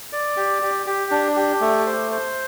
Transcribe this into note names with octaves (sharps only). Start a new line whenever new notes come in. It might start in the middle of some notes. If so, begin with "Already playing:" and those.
D5
G4
G4
G4
D4
G4
A3
C5
C5